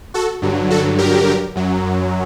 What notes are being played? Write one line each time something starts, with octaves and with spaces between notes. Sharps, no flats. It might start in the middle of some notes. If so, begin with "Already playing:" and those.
F#4 A4
G2 D3 F#3
F#4 A4
G4 A#4
F#2 F#3